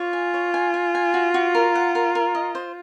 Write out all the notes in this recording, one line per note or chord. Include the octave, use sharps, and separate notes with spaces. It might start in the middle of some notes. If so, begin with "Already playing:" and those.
Already playing: F4 C#5
G#5
C#5
G#5
G#5
G#5
F#4
F#4
A#4
F#5
A#4
A#4
D#5
C5